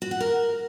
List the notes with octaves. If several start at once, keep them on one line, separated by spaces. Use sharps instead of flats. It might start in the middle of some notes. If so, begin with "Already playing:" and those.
F#4
F#5
A#4